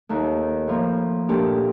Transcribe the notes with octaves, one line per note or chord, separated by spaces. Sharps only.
D#2 D#3 A3
A2 F3 A#3
A#2 A3 D4 G4